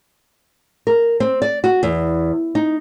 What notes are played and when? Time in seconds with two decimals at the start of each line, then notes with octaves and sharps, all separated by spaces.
0.87 A#4
1.20 C4
1.42 D5
1.64 F#4
1.83 E2
2.55 D#4